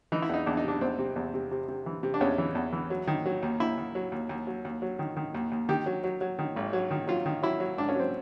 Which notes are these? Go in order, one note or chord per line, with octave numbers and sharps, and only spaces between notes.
E3 D#4
E4
E2 D#4
E2 D4
D#4
C3 D4
E2 C4
C3
E2
C3
C3
C3
E3
C3
D4
E2 C#4
E3
E2
E3
F#3
D#3
F#3
D#2
D#2 E4
D#2
F#3
D#2
D#2
F#3
D#2
F#3
D#3
D#3
D#2
D#2
D#3 G4
F#3
F#3
F#3
D#3
G#1
F#3
D#3
F#3 F4
D#3
F#3 E4
F#3
G#1 D4
C#4
F#3 C4